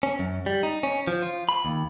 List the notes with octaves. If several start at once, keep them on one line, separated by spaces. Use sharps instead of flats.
C#4
F#2
G3
D#4
C#4
F3
F4
B5
D#2